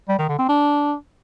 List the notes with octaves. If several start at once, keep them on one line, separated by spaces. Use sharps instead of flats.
G3
D#3
D3
C4
D4